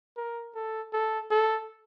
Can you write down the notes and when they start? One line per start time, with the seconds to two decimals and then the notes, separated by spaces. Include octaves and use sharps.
0.17 A#4
0.55 A4
0.93 A4
1.31 A4